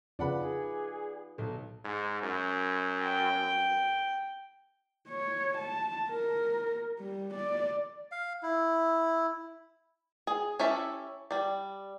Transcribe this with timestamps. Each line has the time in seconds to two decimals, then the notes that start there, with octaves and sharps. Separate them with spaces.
0.19 F2 C#3 F4 B4 D5 F#5 B5
0.39 D#4 F4 G#4
1.38 B1 A4
1.84 G#2
2.23 F#2
3.04 G5
5.09 C#5
5.58 A5
6.10 A#4
6.99 G3
7.34 D5
8.11 F5
8.43 E4
10.27 G#4
10.59 C#4 E4 G4 A4 E5
11.31 G3 D5